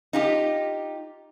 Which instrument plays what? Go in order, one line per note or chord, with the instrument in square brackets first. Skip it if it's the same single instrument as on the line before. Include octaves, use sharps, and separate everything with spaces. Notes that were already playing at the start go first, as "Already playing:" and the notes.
[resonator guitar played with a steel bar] D#4 F4 G4